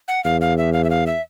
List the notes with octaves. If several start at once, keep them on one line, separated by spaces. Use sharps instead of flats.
F#5
E2 F5
F5
E5
F5
E5
F5
E5